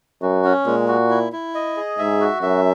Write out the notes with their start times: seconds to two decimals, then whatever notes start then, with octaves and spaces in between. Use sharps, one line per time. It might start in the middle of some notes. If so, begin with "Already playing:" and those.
0.21 F#2 F#4
0.45 C#4
0.66 A#2 G#3
0.88 F#4
1.10 E4
1.33 E4
1.55 D#5
1.77 G#4
1.99 G#2 E5
2.21 F#4
2.42 F#2 E5